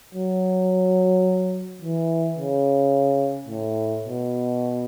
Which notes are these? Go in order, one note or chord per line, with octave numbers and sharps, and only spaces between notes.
F#3
E3
C#3
A2
B2